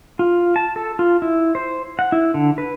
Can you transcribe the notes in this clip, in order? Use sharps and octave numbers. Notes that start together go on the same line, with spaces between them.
F4
A5
A4
F4
E4
C5
F#5
E4
D3
B4